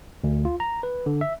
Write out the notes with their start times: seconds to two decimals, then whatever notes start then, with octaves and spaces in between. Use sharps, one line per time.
0.24 D2
0.45 F4
0.60 A#5
0.83 B4
1.06 D3
1.21 E5